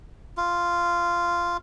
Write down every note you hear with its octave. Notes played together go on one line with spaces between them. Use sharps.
F4